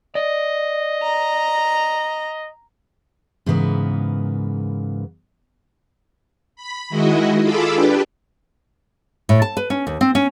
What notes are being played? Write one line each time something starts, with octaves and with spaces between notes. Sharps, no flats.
D5 D#5
A#5
G#2 C#3 E3 B3 A#4 B4
B5
D#3 G#3 E4 F#4 D#5
F4 G#4 A4 B5 D6 E6
D4 G4 B4
A2
A5
B4
C#4
D#2
C4
C#4